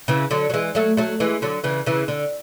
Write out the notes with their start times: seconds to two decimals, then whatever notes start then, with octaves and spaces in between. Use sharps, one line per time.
0.08 C#3 E3
0.31 D3 F#3
0.50 F#3
0.54 E3 G#3
0.75 F#3 A3
0.97 F#3 A3
1.20 E3 G#3
1.42 D3 F#3
1.64 C#3 E3
1.86 C#3 E3
2.08 D3